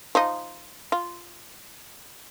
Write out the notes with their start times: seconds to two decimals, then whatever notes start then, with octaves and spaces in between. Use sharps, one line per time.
0.15 F3 D#4
0.92 F4